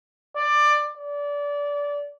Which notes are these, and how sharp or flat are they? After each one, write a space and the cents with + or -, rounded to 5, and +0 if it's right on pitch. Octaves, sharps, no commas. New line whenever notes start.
D5 +15
D5 -25